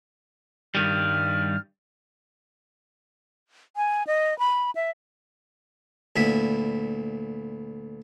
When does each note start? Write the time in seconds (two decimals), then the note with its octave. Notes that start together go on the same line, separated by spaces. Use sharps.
0.75 G2 D#3 G3 F6
3.76 G#5
4.07 D#5
4.39 B5
4.75 E5
6.16 D2 A#2 B3 E4 B5